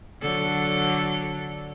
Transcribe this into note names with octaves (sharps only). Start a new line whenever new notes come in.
D3 F#3 A4